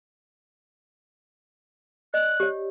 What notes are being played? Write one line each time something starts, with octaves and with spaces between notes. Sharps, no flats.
D5 D#5 F#6
G4 C#5